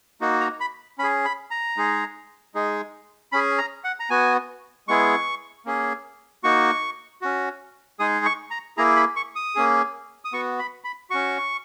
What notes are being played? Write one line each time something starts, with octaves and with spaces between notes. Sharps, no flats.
A#3 D#4 F#4
A#5
B5
C#4 G#4 B5
B5
A#5
G#3 D#4 G#4
G#3 D#4 G#4
C#4 G#4 B5
A#5
F#5
A#5
B3 F#4 G#5
G#3 B3 E4 G#4 C#6
A#3 C#4 G#4
A#3 D#4 F#4 C#6
C#4 F#4
G#3 D#4 G#4 D#6
C#6
A#5
A#3 E4 G#4 A#5
B5
C#6
D#6
A#3 C#4 G#4
D#6
B3 F#4 C#6
B5
B5
C#4 F#4 C#6